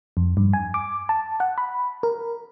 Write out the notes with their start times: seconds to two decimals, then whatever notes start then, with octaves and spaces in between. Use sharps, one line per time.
0.17 F2
0.37 G2
0.53 G#5
0.74 D6
1.09 A5
1.40 F#5
1.58 B5
2.03 A#4